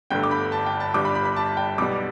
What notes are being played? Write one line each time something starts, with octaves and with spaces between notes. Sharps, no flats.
G1 G2 D3 A3 G5
D6
B5
A5
G5
A5
G1 G2 G3 D6
B5
B5
B5
A5
G5
B1 B2 G3 D6